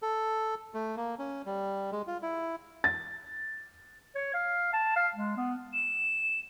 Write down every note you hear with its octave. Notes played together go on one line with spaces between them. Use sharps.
A4
A3
A#3
C#4
G3
G#3
F4
E4
A6
C#5
F5
A5
F5
G#3
B3
E7